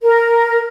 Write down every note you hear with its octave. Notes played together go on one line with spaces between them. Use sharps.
A#4